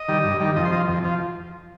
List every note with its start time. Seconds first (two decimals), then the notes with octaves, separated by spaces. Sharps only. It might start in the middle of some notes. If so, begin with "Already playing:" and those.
Already playing: D#5
0.08 D#3 G3
0.24 G2
0.40 D#3 G3
0.56 F2 D#5
0.65 C5
0.72 F3 D#5
0.89 F2
1.04 F3